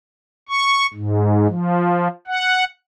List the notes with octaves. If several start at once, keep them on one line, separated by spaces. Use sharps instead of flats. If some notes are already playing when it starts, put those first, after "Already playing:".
C#6
G#2
F3
F#5